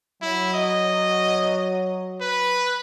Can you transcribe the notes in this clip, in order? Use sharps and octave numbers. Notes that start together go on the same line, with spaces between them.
F#3 E4
D#5
B4